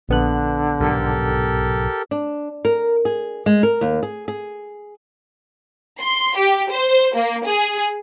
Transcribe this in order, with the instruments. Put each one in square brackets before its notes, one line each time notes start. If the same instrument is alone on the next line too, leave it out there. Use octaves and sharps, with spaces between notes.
[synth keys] A#1 B3 F#6 [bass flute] D3
[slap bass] B1 G#2 [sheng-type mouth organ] G4 A4 A#4
[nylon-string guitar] D4
A#4
G#4
G#3
A#4
D#2
G#4
G#4
[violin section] C6
G4
C5
A#3
G#4